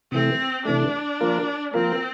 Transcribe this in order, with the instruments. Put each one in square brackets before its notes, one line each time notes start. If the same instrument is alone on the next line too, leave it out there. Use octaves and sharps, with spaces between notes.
[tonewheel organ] C3 E3 A3 [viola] C4
[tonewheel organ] C3 E3 A3 [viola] D4
[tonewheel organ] F3 A#3 F4 A#4
[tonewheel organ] F3 A#3 F4 A#4 [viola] C4